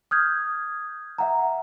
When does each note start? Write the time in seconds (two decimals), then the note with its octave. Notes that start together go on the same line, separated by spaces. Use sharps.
0.11 D#6 F6 G6 G#6
1.18 E5 F#5 A#5